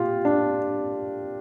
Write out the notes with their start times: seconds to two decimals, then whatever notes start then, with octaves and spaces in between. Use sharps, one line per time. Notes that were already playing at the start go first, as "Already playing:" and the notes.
Already playing: A#2 F4 G4
0.25 D4